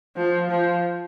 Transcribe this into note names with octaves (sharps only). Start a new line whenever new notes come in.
F3
F3